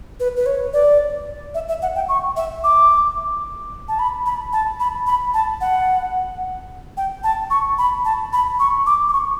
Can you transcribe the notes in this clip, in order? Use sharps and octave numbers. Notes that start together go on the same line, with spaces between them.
B4
B4
C#5
D5
E5
E5
F#5
G5
C#6
E5
D6
A5
B5
B5
A5
B5
B5
A5
F#5
G5
A5
C#6
B5
A5
B5
C#6
D6
D6
C#6